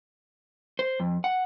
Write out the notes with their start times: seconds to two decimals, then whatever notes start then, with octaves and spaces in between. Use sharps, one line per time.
0.79 C5
1.00 F2
1.24 F#5